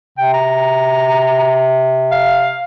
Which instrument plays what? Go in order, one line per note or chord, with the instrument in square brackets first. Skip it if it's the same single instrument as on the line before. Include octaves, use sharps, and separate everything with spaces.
[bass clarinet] C3 [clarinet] G5
[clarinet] A#5
F5